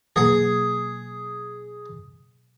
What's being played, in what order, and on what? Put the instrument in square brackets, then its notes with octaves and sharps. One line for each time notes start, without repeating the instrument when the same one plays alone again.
[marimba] B2 F#3 A#3 [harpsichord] G#4